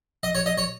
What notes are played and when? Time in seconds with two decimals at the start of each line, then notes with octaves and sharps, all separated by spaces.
0.23 D#5
0.35 C#5
0.46 D#5
0.58 C#5